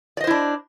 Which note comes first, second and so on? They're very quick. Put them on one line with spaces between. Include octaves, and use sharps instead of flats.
D5 D#5 C5 E4 D4